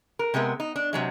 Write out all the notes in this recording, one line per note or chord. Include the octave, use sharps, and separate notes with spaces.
A#4
C3 G#3 B3 A#4
D#4
D4
C3 F#3 G#3